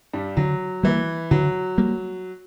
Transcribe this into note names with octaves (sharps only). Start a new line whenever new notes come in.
G2 G3
D3 F#3
E3 G3 A#3
D3 F#3
G3 A#3